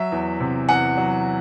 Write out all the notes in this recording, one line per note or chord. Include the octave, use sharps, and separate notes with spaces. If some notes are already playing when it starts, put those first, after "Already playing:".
Already playing: F#3 E5
E2
C3
E2 F#5
F#3